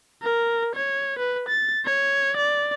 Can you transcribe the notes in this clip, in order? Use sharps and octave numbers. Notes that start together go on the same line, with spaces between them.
A#4
C#5
B4
A6
C#5
D5